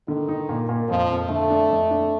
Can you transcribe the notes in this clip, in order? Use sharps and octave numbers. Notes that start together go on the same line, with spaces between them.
D3 D#3
D#4
A#2
A#2
F2 F3
F2
D3 A3
D4
F2
D4